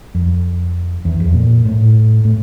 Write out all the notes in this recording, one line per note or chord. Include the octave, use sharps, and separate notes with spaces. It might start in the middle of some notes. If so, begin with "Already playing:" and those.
F2
E2
F2
A#2
A2
A2